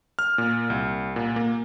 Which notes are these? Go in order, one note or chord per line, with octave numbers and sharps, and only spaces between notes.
F6
A#2
C2
A#2
A#3